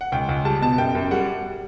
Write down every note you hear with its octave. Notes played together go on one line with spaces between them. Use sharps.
F#5
C#2 G5
C#2
G3 A5
B2 A5
F#2 G5
F#2
G3 F#5